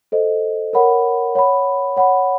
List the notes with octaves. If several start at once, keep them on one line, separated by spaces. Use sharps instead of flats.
A4 C5 D#5
A#4 C#5 F#5 B5
C#5 F#5 B5
C#5 F#5 B5